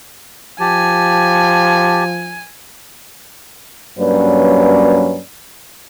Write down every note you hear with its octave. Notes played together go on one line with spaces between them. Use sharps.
F3 G4 G#5 A5
G2 F#3 A#3 C#4 B4 D5